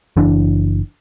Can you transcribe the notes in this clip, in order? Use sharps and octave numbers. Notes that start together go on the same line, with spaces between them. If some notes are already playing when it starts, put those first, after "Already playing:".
F#1 E3 D4